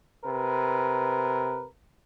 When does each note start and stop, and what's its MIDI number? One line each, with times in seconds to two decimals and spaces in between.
0.23 1.65 48
0.23 1.65 70
0.23 1.65 71